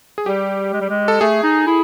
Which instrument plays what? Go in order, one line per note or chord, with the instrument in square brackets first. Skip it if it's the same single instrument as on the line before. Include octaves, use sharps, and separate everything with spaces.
[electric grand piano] G#4
[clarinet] G3 [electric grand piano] G4
[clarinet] G#3
G3
G#3
[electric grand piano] A4
[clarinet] A3 [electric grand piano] G#4
[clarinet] D#4
E4